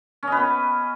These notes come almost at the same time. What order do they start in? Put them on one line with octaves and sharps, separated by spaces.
C#4 D#5 B4 B3